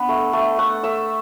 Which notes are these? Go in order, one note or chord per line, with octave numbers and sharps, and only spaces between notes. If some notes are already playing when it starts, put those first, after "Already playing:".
Already playing: B3 D4
A3
A3
A3 F#5
A3 E5